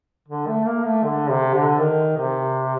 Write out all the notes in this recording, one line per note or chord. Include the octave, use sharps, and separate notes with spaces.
D3
A3
A#3
A3
D3
C3
D3
D#3
C3